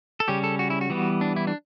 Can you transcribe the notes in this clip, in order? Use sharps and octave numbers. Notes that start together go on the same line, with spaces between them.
A4
C#3 G3 C#4 G4
A4
F#4
E4
F#4
E3 G3 B3
D4
E4
D4